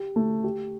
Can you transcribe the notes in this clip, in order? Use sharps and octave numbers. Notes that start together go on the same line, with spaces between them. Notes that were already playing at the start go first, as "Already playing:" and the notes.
Already playing: G4
A3
G4